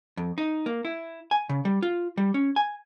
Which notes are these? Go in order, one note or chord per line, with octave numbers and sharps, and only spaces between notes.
F2
D#4
A#3
E4
G#5
C#3
G3
F4
G3
C#4
G#5